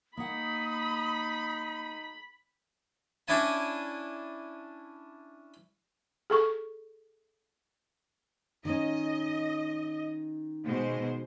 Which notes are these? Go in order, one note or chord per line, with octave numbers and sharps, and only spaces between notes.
A#3 D#4 F#5 B5 D#6
C#4 D4 E4 G#5 A5
G#4 A4 C#6
D#3 C#4 D#5
B2 G#3 C5